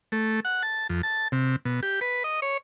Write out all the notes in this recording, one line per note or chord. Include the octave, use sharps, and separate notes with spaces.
A3
F#5
A5
F2
A5
C3
B2
G4
B4
D#5
C#5